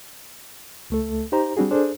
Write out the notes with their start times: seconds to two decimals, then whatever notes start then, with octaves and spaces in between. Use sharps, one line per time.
0.90 C#2 A3 A4
1.32 D#4 G4 C5 A#5
1.57 G3 C4 D4 F#4 G#4
1.71 D4 G#4 A4 C5